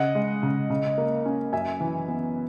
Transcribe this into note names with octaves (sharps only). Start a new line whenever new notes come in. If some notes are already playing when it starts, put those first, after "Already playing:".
Already playing: C#3 D#5 F#5
G#3
C#3
C#3
A#3
C#4
F#2 E5 G#5
E3
B3